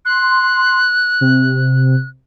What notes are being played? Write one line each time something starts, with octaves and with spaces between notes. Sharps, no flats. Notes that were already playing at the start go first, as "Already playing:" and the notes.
C6 F#6
C3